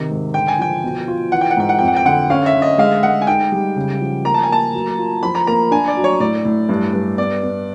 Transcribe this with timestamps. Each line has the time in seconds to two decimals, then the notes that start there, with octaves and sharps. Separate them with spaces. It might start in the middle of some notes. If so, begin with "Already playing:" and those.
Already playing: C3 D#3
0.10 G#2
0.34 D3 G5
0.48 G#5
0.59 F3 G5
0.84 B2
1.08 F4
1.32 E3 F#5
1.41 G5
1.51 F#5
1.57 G#2 G5
1.69 F#5
1.79 F2 G5
1.88 F#5
1.96 G5
2.05 D3 F#5
2.30 C#4 F5
2.46 E5
2.54 D3
2.62 D#5
2.78 G#3 F5
3.03 G#3 F#5
3.22 G#5
3.27 D#4 G5
3.52 G3
3.76 C#3
4.01 F3
4.25 A#3 A#5
4.34 A5
4.43 G#5
4.49 A#3 A5
4.74 F#3
4.98 F4
5.23 F3 B5
5.35 A#5
5.47 A#3 A#5
5.71 D4 G#5
5.88 D5
5.97 F#3
6.04 C#5
6.20 A2 D5
6.45 A2
6.69 G2
6.93 G2
7.18 B3 D5
7.43 B3